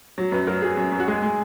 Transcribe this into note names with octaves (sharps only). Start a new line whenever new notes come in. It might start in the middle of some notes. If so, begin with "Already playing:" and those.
F#3
F#2 B4
F#3 A#4
F#3 G#4
F#2
F#2
F#4
G#3 G#4
G#3